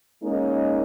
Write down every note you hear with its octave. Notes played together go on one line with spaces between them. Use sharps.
G#3 A#3 C#4 D#4